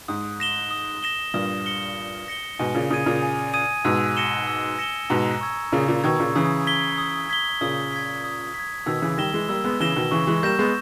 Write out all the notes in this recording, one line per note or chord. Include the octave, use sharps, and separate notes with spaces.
G#2 D#6
A#6 E7 G7
D#6
A#6 E7 G7
G2 A#2 D#6
A#6 C#7 G7
D#6
A#6 C#7 G7
G#2 B2 G#5
A#2 C#3
A#2 C#3 D#6 G#6 D#7
A#2 C#3
G#5
D#6 G#6 D#7
G#2 B2 E6
A#6 C#7 E7 G7
E6
A#6 C#7 E7 G7
G#2 B2 A#5
C#6 E6 G#6
A#2 C#3 A#5
A#2 C#3
B2 D#3 C#6 E6 G#6
A#2 C#3
C#3 E3 D#6
G#6 B6 G7
D#6
G#6 B6 G7
A#2 C#3 D#6
G#6 B6
D#6
B6
G#6
B2 D#3 E6
C#3 E3
D#3 G3 A#6 E7 G7
E3 G#3
G3 A#3 E6
G#3 B3
C#3 E3 A#6 E7 G7
B2 D#3
C#3 E3 C#6
E3 G#3
G3 A#3 G6 A#6 E7
G#3 B3